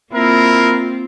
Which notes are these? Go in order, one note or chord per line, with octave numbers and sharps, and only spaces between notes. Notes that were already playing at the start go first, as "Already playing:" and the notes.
A#3 C4 E4 F4 A#4